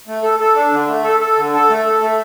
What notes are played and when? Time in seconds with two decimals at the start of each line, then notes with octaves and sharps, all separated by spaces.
0.07 A3
0.23 A4
0.40 A4
0.55 D4
0.72 D3
0.87 A3
1.04 A4
1.20 A4
1.37 D3
1.53 A4
1.70 A3
1.86 A4
2.01 A3